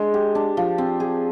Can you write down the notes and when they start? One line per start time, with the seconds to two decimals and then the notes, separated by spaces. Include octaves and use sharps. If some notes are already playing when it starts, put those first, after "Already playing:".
Already playing: G#3 D4
0.14 G4
0.35 D4
0.57 F3
0.78 C4
1.00 G#4